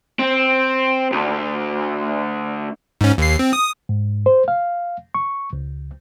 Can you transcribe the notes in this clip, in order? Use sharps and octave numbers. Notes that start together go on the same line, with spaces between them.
C4
D2
G#2 C#4
D#2 C7
C4
D#6
G#2
C5
F5
C#6
C#2